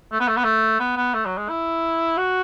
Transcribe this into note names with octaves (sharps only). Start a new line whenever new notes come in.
A3
B3
A3
B3
A3
B3
B3
A3
F#3
G#3
E4
F#4